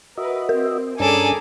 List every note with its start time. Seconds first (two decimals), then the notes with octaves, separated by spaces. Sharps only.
0.17 F#4 A#4 B4 D#5 E5
0.49 C4 A#4
1.00 G2 C#4 D4 G#4 A4 G#5 A#5 D6